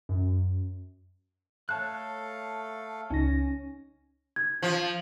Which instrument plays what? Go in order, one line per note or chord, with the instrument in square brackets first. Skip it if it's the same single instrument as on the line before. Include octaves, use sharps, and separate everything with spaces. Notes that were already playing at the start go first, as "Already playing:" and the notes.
[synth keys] F#2
[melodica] A3 A4 F5 [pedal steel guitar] C#5 A5 F#6
[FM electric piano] C#2 D#4 A#6 [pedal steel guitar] C#4
[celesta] G#6
[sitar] F3